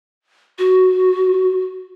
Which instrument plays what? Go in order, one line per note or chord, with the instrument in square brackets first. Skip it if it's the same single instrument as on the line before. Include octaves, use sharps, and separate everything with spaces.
[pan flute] F#4